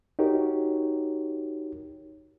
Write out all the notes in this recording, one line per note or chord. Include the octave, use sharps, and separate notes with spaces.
D#4 F#4 G4 A#4 C#5